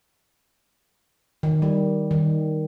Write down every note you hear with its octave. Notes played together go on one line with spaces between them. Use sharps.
D#3
G3
D#3